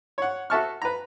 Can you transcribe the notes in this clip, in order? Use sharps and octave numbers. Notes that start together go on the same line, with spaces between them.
C#5 F#5
F#4 A4 E5 A5 C#6 F6
B4 A#5